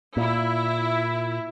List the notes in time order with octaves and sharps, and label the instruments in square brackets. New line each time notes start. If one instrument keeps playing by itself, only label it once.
[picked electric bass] A#2 [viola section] E4